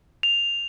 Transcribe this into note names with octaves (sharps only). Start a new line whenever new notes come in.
F7